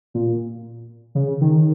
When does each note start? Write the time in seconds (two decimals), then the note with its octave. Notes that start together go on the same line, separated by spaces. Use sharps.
0.14 A#2
1.15 C#3
1.41 D#3